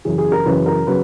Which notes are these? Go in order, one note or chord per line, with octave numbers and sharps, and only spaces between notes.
F#2 C#3 E3 G#4
G#4
A#4
F#2 C#3 E3 B4
A#4
C#3 F#3 B4